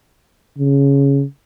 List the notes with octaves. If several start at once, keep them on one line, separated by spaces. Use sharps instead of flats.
C#3